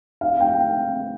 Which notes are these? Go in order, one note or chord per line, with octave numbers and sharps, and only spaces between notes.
F5
G5